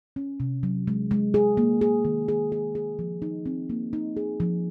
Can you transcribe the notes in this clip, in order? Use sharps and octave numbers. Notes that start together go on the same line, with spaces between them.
C#4
C3
F#3
G#3
G#3
G#4
A#3
G#4
D#3
G#4
G#4
G#4
F3
D#4
C4
A#3
D#4
G#4
F3